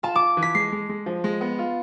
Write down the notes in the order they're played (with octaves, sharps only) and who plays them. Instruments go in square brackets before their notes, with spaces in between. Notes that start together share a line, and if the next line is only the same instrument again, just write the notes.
[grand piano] F4 [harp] A5
[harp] D6
[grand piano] F4
E3
[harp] B6
[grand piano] G#3 [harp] C7
[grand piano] G#3
G#3
F3
G#3
B3
F4